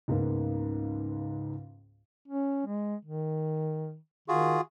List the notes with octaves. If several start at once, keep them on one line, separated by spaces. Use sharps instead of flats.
C#2 G#2 C#3 A#3 B3
C#4
G#3
D#3
D#3 F4 F#4 G#4